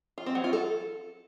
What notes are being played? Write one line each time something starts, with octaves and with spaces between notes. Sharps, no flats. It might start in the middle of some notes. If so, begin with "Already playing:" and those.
F4
C4
F#3
F4
A4